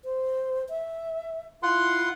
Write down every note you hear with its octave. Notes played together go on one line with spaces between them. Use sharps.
C5
E5
E4 F4 F#5 C6